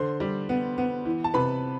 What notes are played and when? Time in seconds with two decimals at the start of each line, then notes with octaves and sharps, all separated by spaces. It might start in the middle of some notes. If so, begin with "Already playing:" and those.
Already playing: D3 C5 C6
0.20 G3
0.49 B3
0.78 B3
1.05 E3
1.24 A5
1.34 C3 B4 B5